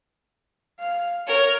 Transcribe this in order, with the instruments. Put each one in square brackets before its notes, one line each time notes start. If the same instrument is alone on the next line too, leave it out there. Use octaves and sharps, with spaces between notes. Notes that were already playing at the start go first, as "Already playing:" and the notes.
[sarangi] F5
[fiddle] A#4 [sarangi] C#5